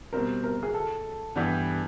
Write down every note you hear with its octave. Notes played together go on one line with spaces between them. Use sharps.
B2 G3 C4 A#4
A#4
G#4
A4
G2 E3 G3 B3 D4